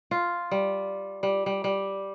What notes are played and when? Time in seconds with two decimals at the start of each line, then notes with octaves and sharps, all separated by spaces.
0.11 F4
0.51 G3
1.23 G3
1.46 G3
1.64 G3